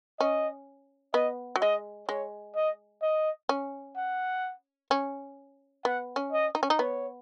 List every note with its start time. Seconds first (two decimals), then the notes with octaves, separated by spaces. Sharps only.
0.20 C#4 D#5
1.14 B3 D#5
1.56 F#3
1.61 G#3 D#5
2.09 G#3 C#5
2.56 D#5
3.02 D#5
3.49 C#4
3.96 F#5
4.91 C#4
5.85 B3 F#5
6.16 C#4
6.33 D#5
6.55 D#4
6.63 C#4
6.70 D#4
6.79 B3 C#5